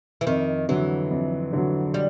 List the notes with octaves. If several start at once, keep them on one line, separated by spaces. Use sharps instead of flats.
E3
F2 D#3
D3 E3 F#3
F2
D3 F#3
G3